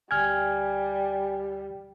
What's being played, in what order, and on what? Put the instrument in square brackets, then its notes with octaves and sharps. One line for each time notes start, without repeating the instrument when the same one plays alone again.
[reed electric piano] D2 F6 G#6 [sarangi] G3 [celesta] G#5